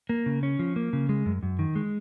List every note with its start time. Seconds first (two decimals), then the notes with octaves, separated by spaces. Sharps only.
0.09 A#3
0.26 C#3
0.43 C#4
0.59 F3
0.76 A#3
0.93 C#3
1.09 G#3
1.26 F#2
1.43 F#2
1.59 D#3
1.76 G#3